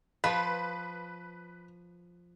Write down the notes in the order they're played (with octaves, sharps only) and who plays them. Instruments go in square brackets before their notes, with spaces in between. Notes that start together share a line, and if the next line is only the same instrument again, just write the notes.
[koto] F3 [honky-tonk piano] B4